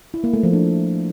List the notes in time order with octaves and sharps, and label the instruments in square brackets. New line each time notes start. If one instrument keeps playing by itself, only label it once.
[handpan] E4
A#3
A3
F3
D4